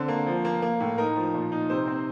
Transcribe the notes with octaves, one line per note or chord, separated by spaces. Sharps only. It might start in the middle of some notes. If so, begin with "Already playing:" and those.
Already playing: D3 C4
A#3
F3
A#3
A#3
A2
D#4 A#4
F3
A#2
D#4
C3 C5
C4